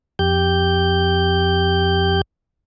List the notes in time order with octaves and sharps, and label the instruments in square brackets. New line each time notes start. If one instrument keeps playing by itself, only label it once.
[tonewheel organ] F2 G4 G6